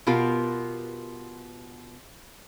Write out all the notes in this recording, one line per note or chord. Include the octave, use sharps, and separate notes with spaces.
B2 B3 F4 G4 A#4